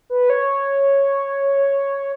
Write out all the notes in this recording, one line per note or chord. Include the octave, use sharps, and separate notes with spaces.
B4
C#5